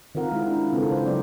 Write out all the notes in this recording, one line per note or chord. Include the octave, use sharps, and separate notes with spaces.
D#3 C4 F4 A#4 F#5
G#3 E4
D4
C#3 C4 D#4 F4 A4 B4
C5
F#3 C#4 D5